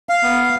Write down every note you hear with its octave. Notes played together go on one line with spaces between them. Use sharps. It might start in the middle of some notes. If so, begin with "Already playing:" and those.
F5
B3